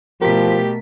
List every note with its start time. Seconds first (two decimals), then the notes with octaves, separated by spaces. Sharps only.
0.22 B2 F3 A3 G4 A#4 B6